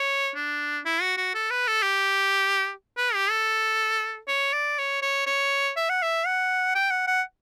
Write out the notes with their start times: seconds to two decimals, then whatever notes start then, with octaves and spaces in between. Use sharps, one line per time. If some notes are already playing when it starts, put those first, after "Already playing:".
Already playing: C#5
0.35 D4
0.85 E4
1.01 F#4
1.17 F#4
1.34 A4
1.50 B4
1.67 A4
1.82 G4
2.97 B4
3.14 G4
3.30 A4
4.28 C#5
4.53 D5
4.78 C#5
5.02 C#5
5.26 C#5
5.76 E5
5.89 F#5
6.02 E5
6.26 F#5
6.75 G5
6.91 F#5
7.07 F#5